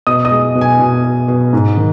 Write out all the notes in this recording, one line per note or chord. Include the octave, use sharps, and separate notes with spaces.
B2 D#5 D#6
D#5 D#6
G#3
B2
G#5
B2
B2
B2
G#2
D#3